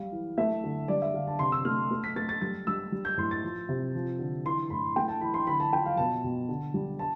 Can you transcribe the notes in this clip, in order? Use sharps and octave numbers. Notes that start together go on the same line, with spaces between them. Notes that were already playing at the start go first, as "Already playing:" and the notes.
Already playing: G3 F5
E3
A3 E5
D3
G3 D5
E5
D3 F5
A5
C3 C6
E6
A3 F6
A3
B6
A3 A6
A6
G3 A6
G3 E6
G3
G6
A2 C6
A6
F3
C3
F3
D3
E3 C6
A2 B5
A3 G5
A5
E3 B5
C6
D3 B5
A5
F3 G5
F5
B2 A5
B2
D3
G3
A5